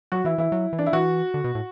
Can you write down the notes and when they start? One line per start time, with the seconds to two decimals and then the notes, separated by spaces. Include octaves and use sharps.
0.12 F#3 F#4
0.25 E3 E4
0.38 E3 E4
0.52 F#3
0.73 E3
0.79 D4
0.86 E4
0.93 E3 F#4
1.34 D3
1.44 B2
1.55 A2